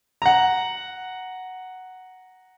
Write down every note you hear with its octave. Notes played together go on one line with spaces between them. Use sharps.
F#5 A#5